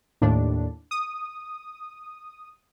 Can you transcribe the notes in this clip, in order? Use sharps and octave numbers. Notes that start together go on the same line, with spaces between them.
D#2 A2 D4
D#6